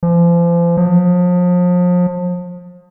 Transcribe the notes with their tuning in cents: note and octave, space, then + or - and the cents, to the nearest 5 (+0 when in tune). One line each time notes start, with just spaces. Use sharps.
F3 -35
F3 +35